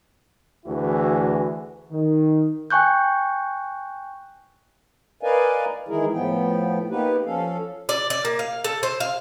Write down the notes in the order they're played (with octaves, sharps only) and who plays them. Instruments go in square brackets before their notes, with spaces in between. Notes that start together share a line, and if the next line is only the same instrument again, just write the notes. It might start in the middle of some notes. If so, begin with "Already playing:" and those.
[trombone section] D2 E3 E4 F#4 G#4
D#3
[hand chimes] G5 G#5 C#6 F#6 G6
[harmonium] A#4 B4 D5 D#5 F5 G#5
D#3 E3 G#3 E4 G#4 A#4
A2 F3 B3 G5
A#3 B3 D#4 G4 B4
F3 C#4 A4 F5
[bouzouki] D5
D5
A#3
F5
A4
C5
F5